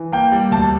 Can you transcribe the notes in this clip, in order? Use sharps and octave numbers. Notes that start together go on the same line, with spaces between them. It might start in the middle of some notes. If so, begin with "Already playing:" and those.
Already playing: E3
A#3 G5
G3
D2 A5